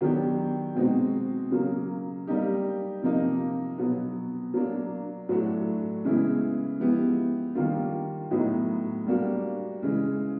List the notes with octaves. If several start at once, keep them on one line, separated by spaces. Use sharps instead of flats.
D#3 F#3 B3 D4 G4
B2 G#3 C4 D#4 F#4
C#3 F#3 A#3
G3 A#3 D#4 G4
C3 F3 A#3 D#4
B2 F#3 B3
F#3 A#3 D4
A2 F#3 A3 D4 F#4
C#3 E3 G#3 B3 E4
F3 G#3 B3 E4 G4
D#3 G3 A#3 D4 F4
A2 F#3 B3 D#4 F#4
G3 A#3 D4 F#4
C#3 E3 G#3